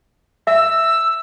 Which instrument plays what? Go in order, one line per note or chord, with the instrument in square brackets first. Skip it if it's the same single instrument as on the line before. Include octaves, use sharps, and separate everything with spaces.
[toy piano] E5 [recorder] E6